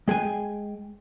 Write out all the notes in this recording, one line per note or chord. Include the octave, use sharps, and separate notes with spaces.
G#3 G#4 G5 G#5